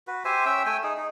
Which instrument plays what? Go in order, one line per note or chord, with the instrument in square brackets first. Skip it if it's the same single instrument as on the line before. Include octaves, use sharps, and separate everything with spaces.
[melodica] F#4 B4
G4 C5 E5 G#5
C#4 E5 G5 E6
A3 G5 G#5 E6
D#4 G#4
D#4